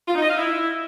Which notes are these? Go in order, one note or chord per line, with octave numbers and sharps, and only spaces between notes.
F4
D#4
D#5
F5
E4